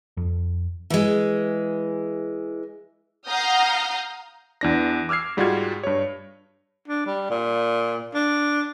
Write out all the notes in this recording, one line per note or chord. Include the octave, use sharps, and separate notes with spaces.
F2
E3 G#3
F5 F#5 A#5 D#6 F6 G6
E2 D4 A#6
D6 E6 F6 G#6 C7
G#2 G3 G#3 F4 F#4 G#6
G2 C#5
D4
G3
A#2
D4